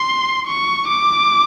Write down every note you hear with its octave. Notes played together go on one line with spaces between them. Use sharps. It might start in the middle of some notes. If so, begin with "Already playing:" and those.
Already playing: C6
C#6
D6